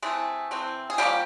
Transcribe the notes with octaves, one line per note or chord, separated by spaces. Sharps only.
C3 E3 G#3 A3 C4 G#4
C3 E3 A3 C4
G#4
C#3 F3 G3 A#3 G4